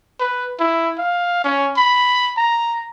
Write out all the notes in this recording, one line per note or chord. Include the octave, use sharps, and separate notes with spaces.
B4
E4
F5
C#4
B5
A#5